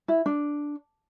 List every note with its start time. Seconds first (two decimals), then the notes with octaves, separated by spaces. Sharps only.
0.08 E4
0.26 D4